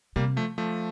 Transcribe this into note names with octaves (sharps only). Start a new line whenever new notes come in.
C3 G3 A#3
F3 A3
F3 A3